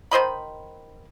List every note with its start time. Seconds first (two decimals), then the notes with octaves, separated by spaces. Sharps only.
0.11 D#3 C5 D#5 B5